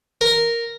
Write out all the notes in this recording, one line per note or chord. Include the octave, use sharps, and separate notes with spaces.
A#4